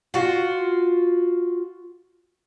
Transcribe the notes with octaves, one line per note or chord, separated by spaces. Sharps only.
F4 F#4